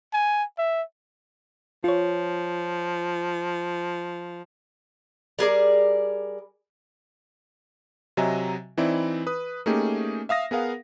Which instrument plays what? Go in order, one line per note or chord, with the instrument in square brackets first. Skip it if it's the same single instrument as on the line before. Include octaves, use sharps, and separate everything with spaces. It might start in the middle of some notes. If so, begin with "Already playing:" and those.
[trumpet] G#5
E5
[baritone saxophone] F3 [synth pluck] F4 C#5
[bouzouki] G3 G#4 A#4 D5
[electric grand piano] C3 F#3 D#5 E5 G#5 A#5
E3 C4 D#4 E4 D5
B4 D#6
A3 A#3 C#4 D#4 G4 G#4
E5 F5 D#6 A#6
B3 G#4 A#4 F5 F#5